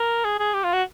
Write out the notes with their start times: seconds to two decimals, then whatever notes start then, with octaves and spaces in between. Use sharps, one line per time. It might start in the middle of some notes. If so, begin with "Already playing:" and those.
Already playing: A#4
0.25 G#4
0.39 G#4
0.54 G4
0.64 F4
0.73 F#4